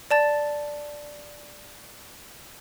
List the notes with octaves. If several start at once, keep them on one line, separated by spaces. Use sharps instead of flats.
D5 A5 A6